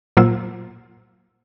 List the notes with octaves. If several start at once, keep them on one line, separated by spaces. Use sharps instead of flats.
A#2 F#3 A#3 F4 C5 E6